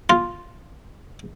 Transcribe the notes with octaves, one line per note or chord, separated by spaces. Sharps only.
F4